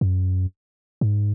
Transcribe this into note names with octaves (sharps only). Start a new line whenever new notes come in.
F#2
G#2